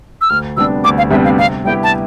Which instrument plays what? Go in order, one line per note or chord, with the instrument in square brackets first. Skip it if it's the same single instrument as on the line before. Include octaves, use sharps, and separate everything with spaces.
[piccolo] E6
[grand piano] D2 [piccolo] F6
[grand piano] C3 G3 B3 D4 [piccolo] E6
[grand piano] D2 [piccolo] D6
[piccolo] F5
[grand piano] C3 G3 B3 D4 [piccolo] E5
[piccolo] F5
[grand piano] C3 [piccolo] F5
[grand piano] G3 B3 E4 G4 [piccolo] G5
[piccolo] A5